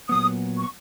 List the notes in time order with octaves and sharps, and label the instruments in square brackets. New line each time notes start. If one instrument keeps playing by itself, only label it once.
[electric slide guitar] A#2 F#3 B3 [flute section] D#6
[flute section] C#6